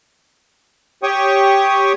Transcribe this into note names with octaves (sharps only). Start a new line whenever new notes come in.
G4 C#5 G5 C#6 D#6